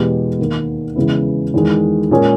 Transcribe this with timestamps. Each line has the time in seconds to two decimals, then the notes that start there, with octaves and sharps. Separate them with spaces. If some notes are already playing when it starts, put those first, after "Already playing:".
Already playing: E2 B2 G#3 B3 G4
0.39 D#2 D#3 A#3
0.96 E2 C#3 G#3 B3 E4
1.54 E2 D#3 G#3
2.11 A#2 G#3 C#4 G#4